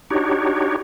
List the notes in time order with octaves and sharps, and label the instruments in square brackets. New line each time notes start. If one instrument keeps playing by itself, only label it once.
[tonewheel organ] D4 D#4 F#4 G4 C#5